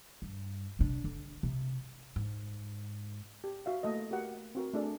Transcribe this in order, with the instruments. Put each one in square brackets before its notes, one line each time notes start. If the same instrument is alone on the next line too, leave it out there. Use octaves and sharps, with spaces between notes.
[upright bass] G2
C3 D4
D3
C3
G#2
[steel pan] G4
F#4 E5 F5
A3 A#3 D#5
F#4 G4 A#4 F#5
C4 F#4 A#4
A3 D4 G#4 D5